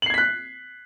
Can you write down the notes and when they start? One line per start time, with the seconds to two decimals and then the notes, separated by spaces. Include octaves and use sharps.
0.02 F#7
0.06 C7
0.10 G#6
0.14 B6
0.18 F#6